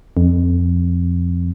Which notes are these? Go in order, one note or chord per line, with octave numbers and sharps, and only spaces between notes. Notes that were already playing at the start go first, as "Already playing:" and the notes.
F2